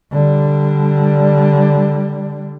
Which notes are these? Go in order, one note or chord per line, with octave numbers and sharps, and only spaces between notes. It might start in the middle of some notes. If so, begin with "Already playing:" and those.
D3 G3